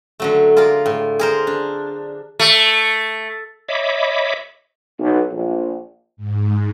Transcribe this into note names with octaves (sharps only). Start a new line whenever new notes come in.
D3 F#3 A3
F4 G#4 A#4 D5
A2
G#4 A#4 C5
D4
A3
C#5 D#5 E5 B5 D6
B1
A#1
G#2